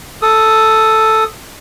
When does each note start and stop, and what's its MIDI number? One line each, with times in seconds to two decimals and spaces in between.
0.22 1.24 69
0.22 1.24 87